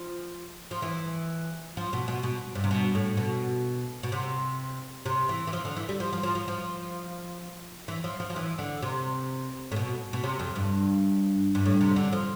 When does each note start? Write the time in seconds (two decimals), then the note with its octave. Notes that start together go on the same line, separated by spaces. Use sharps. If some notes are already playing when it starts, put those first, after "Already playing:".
Already playing: F3
0.71 F3
0.82 E3
1.77 F3
1.93 B2
2.08 B2
2.23 B2
2.55 G2
2.64 C3
2.71 B2
2.95 A2
3.17 B2
4.03 B2
4.12 C3
5.06 C3
5.29 E3
5.47 E3
5.53 F3
5.65 D3
5.77 E3
5.89 G3
6.00 F3
6.13 F3
6.23 F3
6.35 F3
6.48 F3
7.88 E3
8.04 F3
8.20 F3
8.30 F3
8.36 E3
8.59 D3
8.82 C3
9.72 A2
9.76 B2
10.13 B2
10.24 C3
10.39 F2
10.55 G2
11.55 G2
11.65 A2
11.81 C3
11.96 D3
12.13 F3